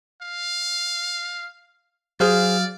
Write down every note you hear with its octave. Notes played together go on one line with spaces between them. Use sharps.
F5
F#3 G#4 C5 D5 F5 F6